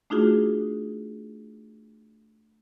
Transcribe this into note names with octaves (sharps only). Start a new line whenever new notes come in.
A3 D4 D#4 F4 F#4 G#4